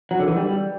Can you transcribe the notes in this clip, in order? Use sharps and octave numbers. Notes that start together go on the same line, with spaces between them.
F#3
D3
E3
G3